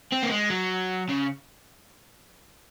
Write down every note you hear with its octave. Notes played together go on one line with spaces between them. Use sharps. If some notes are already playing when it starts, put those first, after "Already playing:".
C4
A#3
G#3
F#3
C#3